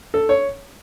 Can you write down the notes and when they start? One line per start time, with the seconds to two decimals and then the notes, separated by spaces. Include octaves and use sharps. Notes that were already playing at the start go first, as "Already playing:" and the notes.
0.14 A4
0.29 C#5